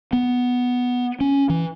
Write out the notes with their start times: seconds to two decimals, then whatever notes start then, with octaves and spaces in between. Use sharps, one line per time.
0.13 B3
1.21 C#4
1.50 E3